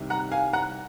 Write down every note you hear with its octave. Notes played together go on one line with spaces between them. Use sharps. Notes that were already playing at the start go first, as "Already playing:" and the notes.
Already playing: C2 C3 D#3
F#5 A#5
F5 G#5
F#5 A#5